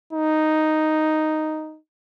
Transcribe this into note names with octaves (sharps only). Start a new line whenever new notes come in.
D#4